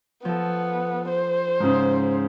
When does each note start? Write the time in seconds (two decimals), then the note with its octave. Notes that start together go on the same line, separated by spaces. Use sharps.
0.25 F3 B3 A4
1.09 C5
1.60 G#2 C#3